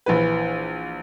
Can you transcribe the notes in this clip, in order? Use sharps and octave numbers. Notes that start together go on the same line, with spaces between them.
A#1 E3 B4